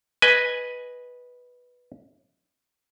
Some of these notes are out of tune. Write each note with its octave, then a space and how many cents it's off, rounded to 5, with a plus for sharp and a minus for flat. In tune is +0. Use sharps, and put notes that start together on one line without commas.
B4 -5 D#5 +0 G#5 +0